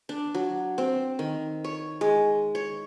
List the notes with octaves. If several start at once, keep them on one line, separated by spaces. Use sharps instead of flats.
D4
F#3
C4
D#3
C#5
G#3
C#5